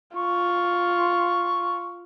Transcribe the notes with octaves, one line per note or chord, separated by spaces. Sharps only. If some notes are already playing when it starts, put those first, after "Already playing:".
F4 C#6